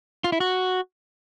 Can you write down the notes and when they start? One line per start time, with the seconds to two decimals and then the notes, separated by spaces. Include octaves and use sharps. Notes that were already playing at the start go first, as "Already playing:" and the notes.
0.24 F4
0.32 E4
0.40 F#4